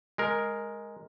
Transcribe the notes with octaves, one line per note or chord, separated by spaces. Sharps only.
G#3 A#4